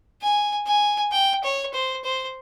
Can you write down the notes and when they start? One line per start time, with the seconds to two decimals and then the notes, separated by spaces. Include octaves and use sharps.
0.22 G#5
0.67 G#5
1.12 G5
1.43 C#5
1.74 C5
2.04 C5